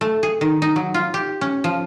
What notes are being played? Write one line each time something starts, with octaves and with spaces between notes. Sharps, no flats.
A3
G#4
D#3
D#4
F#3
F4
G4
C#4
F3